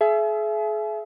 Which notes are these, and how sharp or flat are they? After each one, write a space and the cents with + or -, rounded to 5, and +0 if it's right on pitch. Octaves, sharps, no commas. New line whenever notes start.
G#4 +40 E5 +25 G#5 +45